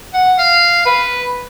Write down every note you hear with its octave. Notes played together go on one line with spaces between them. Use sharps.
F#5
F5
B4